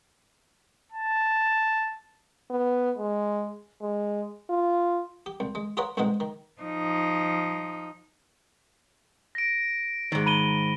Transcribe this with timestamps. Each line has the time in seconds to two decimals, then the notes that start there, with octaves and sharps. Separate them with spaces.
0.92 A5
2.50 B3
2.98 G#3
3.81 G#3
4.49 F4
5.26 G4
5.40 C2
5.55 G#3
5.77 F4 G#4 A#4 B4 C#5 F#5
5.97 C2 G#2 B2 D#3 G#3 F#5
6.20 D#3
6.61 F3 D#4
9.35 A#6 D7
10.12 G#2 D#3
10.26 B5 D#7 G7